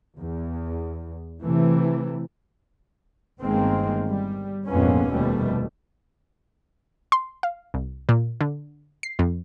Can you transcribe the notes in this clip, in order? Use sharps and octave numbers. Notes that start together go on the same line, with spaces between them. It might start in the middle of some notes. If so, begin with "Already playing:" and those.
E2
C3 E3 A3
G1 D#3 G#3 A#3 C4
G3
A#1 F2 G#2 A#3 B3 C#4
F1 D#2 B2 G3 A3
C6
F5
C2
A#2
D3
C7
F2